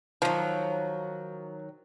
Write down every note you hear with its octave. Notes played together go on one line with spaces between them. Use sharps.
D#3 F3 F#3